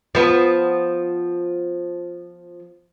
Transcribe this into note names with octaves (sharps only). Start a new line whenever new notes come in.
F3 B3